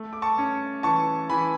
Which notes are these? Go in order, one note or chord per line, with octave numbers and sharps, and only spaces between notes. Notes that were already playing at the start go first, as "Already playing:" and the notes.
Already playing: A3
D6
A5 C#6
C#4
E3 A5 C#6
E3 G#5 B5